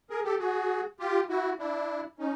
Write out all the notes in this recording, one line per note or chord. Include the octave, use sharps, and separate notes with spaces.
G#4 A#4
G4 A4
F#4 G#4
F4 G4
E4 F#4
D4 E4
C#4 D#4